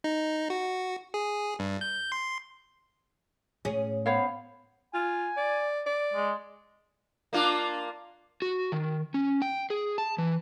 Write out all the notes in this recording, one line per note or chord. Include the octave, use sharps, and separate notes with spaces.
D#4
F#4
G#4
G2
G6
C6
A2 C#4 G#4
B3 C5 C#5 F5
F4 G#5
D5
D5
G#3
A#3 D4 F4
F#4
D#3
C#4
G5
G#4
A5
E3